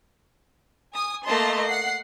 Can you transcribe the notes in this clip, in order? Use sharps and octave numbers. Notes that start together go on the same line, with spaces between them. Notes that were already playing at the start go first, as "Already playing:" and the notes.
G#5 D#6
A3 A#3 D#5 A5 C6
F#5 C7